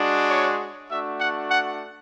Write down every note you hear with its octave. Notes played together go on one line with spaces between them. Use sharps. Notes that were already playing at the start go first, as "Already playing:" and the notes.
Already playing: G#3 D4 F#4
C#5
A3 D4 F#4 E5
F#5
F#5